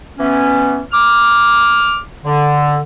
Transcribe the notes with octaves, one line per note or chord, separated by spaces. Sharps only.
E3 B3 C#4
D6 F6
D3